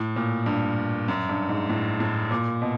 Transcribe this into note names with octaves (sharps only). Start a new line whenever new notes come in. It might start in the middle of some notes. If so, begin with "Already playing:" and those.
Already playing: A2
A#2
G2
F#2
G2
G#2
A2
A2
A#2
B2